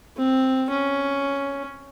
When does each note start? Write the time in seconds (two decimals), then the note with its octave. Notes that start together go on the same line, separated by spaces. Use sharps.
0.17 C4
0.70 C#4